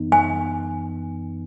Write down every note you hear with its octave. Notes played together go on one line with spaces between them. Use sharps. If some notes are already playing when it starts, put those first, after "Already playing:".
Already playing: F#2 E3 B3 D#4
G#5